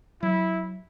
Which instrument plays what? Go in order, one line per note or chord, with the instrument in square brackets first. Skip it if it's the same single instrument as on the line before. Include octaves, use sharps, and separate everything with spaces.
[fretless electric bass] F#3 [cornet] E4